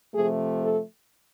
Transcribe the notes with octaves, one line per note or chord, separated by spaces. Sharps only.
C3 F3 A3 G#4
A4